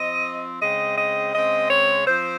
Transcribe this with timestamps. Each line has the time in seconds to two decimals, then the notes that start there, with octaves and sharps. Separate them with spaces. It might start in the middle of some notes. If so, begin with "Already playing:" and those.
Already playing: F3 C4 D#5
0.61 C#3 G#3 C4 D#5
0.97 D#5
1.33 C#3 G#3 C4 D#5
1.70 C#5
2.07 F3 C4 C5